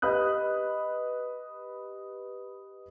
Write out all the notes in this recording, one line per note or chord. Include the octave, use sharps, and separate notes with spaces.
G4 B4 D#5 B5 D#6 F#6